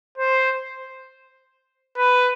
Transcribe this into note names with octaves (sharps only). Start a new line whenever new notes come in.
C5
B4